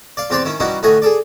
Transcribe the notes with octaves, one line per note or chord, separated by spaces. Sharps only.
D5 F5
E2 C4 G4 D5 A5 C6
D#3 C#4 E4
E3 G3 C#4 D#4 E4 F#4
D2 A2 A3 F#4 D#5 G#5
G#4 A4 D5